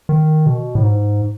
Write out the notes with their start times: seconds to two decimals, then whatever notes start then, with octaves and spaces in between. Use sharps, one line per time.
0.09 D#3
0.46 B2
0.75 A2
0.83 G#2